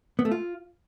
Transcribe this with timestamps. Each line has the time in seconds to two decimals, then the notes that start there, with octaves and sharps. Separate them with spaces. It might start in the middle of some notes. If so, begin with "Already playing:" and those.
0.19 B3
0.25 A3
0.31 F4